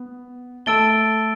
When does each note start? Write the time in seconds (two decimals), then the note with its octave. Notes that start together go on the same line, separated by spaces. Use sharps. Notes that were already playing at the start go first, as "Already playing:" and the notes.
Already playing: B3
0.66 A3 A4 A5 E6 A6 D7 G7